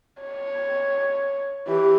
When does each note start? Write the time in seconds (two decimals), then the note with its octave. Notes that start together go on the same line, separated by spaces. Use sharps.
0.23 C#5
1.68 E3 G4